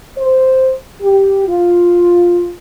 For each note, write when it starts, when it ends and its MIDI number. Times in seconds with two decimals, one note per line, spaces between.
0.18 0.74 72
1.01 1.46 67
1.47 2.52 65